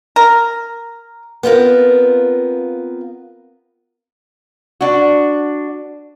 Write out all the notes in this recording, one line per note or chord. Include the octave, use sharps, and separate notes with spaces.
A#4
B3 C4 F4 A#4
D4 F#4